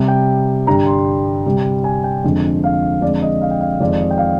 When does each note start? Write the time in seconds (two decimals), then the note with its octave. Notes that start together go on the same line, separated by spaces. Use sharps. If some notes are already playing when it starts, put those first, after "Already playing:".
Already playing: C3 G3
0.08 G5
0.67 G2 D3 G3 A#5
0.86 C6
1.46 C3 G3
1.84 G#5
2.04 G5
2.24 F2 D3 G#3
2.64 F5
3.02 F2 D3 G#3 D5
3.22 D#5
3.41 F5
3.51 G5
3.61 F5
3.80 F2 D#3 G#3 D5
3.91 D5
4.00 D#5
4.11 G5
4.17 F5